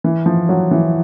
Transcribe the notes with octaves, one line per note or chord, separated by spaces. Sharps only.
E3
F3
F#3
E3